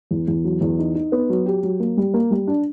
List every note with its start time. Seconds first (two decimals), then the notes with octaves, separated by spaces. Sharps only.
0.11 E2
0.28 E2
0.44 F#3
0.61 E2
0.79 D#4
0.95 D#4
1.12 B3
1.29 F#3
1.46 G4
1.63 F#3
1.80 A#3
1.97 G3
2.14 A#3
2.31 G3
2.47 D4